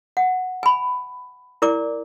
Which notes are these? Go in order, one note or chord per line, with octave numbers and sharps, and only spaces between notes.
F#5
G#5 B5
E4 A#4 D5 D6